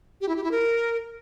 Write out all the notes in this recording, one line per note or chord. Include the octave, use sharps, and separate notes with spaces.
G4
E4
G4
E4
A#4